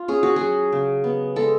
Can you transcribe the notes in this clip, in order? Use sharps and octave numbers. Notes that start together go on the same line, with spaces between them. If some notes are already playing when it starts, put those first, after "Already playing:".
Already playing: F4
C#4 G#4
F#4
G#4
F#3
C#3
B3
G#3 A4